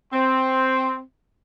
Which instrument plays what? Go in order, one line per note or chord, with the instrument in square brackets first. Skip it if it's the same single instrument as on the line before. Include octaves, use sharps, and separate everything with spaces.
[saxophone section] C4 [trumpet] C6